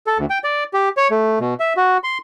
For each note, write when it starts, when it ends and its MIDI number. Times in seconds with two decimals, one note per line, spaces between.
0.07 0.18 69
0.18 0.26 38
0.30 0.39 79
0.44 0.64 74
0.74 0.89 67
0.97 1.08 73
1.11 1.39 57
1.40 1.54 47
1.60 1.73 76
1.77 1.98 66
2.04 2.18 84